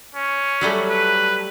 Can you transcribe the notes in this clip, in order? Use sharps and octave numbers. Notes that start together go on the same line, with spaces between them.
C#4
F#3 G3 A3
B4